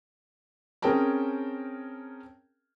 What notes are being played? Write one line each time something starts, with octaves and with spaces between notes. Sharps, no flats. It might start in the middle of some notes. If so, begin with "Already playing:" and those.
C4 C#4 G#4 A#4 G5 A5